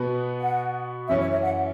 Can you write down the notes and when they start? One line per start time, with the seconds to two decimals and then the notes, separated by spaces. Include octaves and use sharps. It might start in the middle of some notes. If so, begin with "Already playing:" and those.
Already playing: B2 B3 F#4 B4
0.40 F#5
1.08 F#2 E3 C#4 E4 E5
1.21 C#5
1.32 E5
1.43 F#5